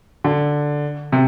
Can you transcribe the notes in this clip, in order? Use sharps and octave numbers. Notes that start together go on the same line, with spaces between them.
D3
C3